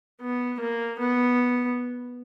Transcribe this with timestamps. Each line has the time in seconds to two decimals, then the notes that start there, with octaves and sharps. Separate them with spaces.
0.21 B3
0.60 A#3
0.98 B3